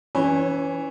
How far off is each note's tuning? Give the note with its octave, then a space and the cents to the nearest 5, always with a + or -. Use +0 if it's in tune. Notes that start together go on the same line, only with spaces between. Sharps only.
E3 +0 C#4 +15 C#5 -25